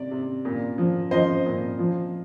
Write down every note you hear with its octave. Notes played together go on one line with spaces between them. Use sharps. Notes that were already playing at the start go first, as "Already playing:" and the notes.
Already playing: C3 D5
C3
A#2
F3
F3 C5 D#5
A#2
F3